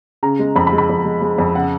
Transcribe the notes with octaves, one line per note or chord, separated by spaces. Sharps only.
C#3 A#5
G#3
F2 B5
B5
G#3
B5
F2
G#3
G#3
F2
C#3 F#5